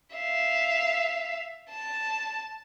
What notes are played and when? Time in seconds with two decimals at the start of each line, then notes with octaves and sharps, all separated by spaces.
0.15 E5 F5
1.70 A5